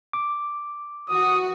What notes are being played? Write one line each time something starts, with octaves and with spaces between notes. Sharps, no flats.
D6
E3 F#4 D#6